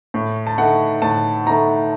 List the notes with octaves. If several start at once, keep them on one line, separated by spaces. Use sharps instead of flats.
A2
A5
A3 D#4 F#5
A2 A5
A3 D#4 A#5